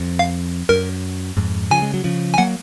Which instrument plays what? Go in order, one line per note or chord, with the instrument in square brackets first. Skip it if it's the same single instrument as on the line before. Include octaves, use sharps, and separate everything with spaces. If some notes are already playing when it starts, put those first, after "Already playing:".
Already playing: [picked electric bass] F2
[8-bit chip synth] F5
[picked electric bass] F#2 [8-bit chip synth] A#4
[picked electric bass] F2 G#2
[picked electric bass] C#3 F3 [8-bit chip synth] G#5
[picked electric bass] G#3
F#3
C#3 F3
[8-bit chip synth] G#5
[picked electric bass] F#3 A#3 [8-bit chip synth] F#5